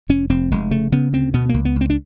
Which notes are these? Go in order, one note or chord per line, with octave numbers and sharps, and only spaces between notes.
F1 C#4
F1 C4
F1 G#3
C#3 A3
C#3 B3
D2 C4
B2 B3
C#2 A#3
B3
C#2
C4
D4